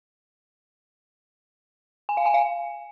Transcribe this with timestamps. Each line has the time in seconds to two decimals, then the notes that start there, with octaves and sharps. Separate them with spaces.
2.09 G#5
2.17 F5
2.26 G#5
2.34 F5